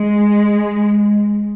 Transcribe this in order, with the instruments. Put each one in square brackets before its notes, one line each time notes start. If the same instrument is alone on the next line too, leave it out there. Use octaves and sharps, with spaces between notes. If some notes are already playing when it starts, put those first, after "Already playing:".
Already playing: [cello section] G#3